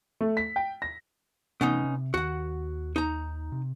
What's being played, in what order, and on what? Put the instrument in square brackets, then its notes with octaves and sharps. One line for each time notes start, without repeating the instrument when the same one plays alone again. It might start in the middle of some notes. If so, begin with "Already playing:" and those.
[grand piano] A3
B6
G5
A#6
[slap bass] C3 E3 A3 [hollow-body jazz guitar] B3 C#4 D#4
[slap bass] C3
[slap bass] D#2 D#3 [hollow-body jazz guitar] F#4 F#5
[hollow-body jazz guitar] D#4 A#5
[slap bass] C3